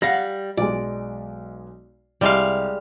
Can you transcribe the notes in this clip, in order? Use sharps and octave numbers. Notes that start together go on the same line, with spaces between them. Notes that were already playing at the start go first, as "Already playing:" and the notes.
G3 F5 F#5 A#6
B1 G#3 D5
C2 G3 G#3 F5